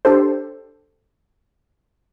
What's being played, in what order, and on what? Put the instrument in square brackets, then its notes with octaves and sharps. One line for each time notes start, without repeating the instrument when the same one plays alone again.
[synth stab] D4 G4 A4 C5